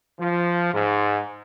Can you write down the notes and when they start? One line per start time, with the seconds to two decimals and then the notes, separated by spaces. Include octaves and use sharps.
0.20 F3
0.73 G#2